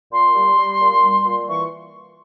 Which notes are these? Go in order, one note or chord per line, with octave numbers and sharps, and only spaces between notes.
A#2 C6
G3
G3
A#2
G3
A#2
E3 C#6